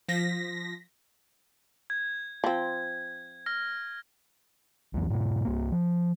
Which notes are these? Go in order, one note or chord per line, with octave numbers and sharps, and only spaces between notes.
F3 A#6 B6
G#6
F3 C4
F6 A#6
C2 F2 E3
G#2 B2
C2 A#3
F3